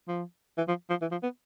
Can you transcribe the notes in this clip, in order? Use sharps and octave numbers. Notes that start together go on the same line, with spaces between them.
F3
E3
F3
F3
E3
F3
B3